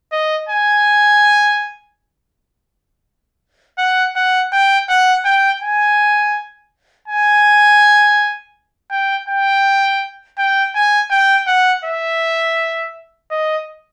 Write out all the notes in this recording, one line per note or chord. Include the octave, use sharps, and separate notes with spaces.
D#5
G#5
F#5
F#5
G5
F#5
G5
G#5
G#5
G5
G5
G5
G#5
G5
F#5
E5
D#5